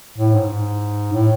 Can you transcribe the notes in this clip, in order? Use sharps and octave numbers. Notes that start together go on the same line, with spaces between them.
A2
G#2
G#2
A2